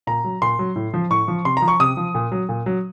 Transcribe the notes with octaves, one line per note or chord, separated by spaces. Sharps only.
A#2 A#5
F#3
A#2 C6
F#3
A2
F3
A2 C#6
F3
C3 C6
A#5
F3
C#6
C3 D#6
F3
A#2
F#3
A#2
F#3